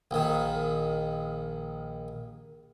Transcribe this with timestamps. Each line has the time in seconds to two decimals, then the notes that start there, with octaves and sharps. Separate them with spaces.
0.11 A#1 D#3